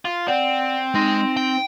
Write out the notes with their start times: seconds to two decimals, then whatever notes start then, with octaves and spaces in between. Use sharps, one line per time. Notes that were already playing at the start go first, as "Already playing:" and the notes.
0.05 F4
0.28 C4 D5 F#5
0.95 G#3 D#4 C6 A#6
1.37 G5